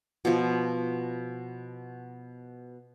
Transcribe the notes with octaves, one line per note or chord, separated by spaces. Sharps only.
B2 F3